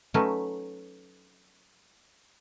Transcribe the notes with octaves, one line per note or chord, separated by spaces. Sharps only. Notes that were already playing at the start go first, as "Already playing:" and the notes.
F#3 A3 C#4 D#4 B4